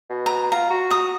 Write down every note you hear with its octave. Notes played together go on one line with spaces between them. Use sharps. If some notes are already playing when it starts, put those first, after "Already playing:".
B2
A#5
F4 A#5
F#4
A#5 D#6